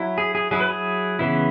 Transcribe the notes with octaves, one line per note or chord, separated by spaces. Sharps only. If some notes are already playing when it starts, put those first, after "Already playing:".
Already playing: F#3 E4
G#4
G#4
F#3 E4 G#4
B4
G#4
C#3 E3 B3 E4